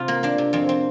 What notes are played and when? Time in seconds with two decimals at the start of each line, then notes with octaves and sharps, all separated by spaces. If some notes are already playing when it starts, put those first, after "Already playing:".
Already playing: C3 F4
0.08 A#3
0.23 A#3 D4
0.38 C3
0.53 F2 C4
0.69 C4